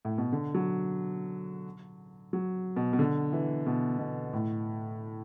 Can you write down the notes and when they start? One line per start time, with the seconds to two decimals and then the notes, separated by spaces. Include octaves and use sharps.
0.05 A2
0.18 B2
0.32 D3
0.54 F#3
2.33 F#3
2.76 B2
2.93 B2
2.99 D3
3.33 E3
3.67 B2
3.99 B2
4.33 A2